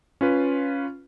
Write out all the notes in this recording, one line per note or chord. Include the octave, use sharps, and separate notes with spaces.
C#4 F4 B4